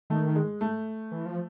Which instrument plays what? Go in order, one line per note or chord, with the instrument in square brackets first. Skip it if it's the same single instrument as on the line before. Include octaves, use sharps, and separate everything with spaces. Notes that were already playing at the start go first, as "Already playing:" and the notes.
[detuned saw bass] D#3 [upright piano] A3
[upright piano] G#3
A3
[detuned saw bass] E3
F3